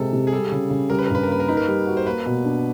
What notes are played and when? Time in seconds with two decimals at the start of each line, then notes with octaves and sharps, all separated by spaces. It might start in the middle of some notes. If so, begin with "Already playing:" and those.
Already playing: C3 G#3 A4
0.13 C3
0.27 G#4
0.33 G3 A4
0.52 C#3
0.70 C#3
0.90 G3 A#4
0.99 B4
1.07 A#4
1.10 G2 B4
1.23 A#4
1.28 A#3 B4
1.40 A#4
1.48 D#4 B4
1.57 A#4
1.68 G3
1.87 F#4
1.97 C5
2.07 A#3 B4
2.26 B2
2.45 D4